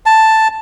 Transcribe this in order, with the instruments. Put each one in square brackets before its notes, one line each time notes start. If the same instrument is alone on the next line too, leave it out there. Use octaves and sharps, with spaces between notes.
[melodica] A5